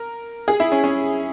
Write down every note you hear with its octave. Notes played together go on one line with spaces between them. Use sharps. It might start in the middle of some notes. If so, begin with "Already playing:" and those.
Already playing: A#4
G#4
E4
C#4
C#4